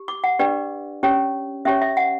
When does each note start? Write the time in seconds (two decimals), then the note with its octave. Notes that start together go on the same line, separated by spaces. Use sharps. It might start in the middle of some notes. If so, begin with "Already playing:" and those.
Already playing: G4
0.08 D6
0.24 F#5
0.39 D4 G4 B4 D5
1.03 C#4 G4 C#5
1.65 C#4 G4 C#5 E5
1.82 E5
1.97 F#5